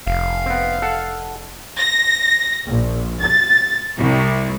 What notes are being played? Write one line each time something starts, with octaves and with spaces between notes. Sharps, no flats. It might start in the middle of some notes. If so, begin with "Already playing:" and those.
F1 F5
B3 C4
A4 F#5
A#6
A#1
A6
C2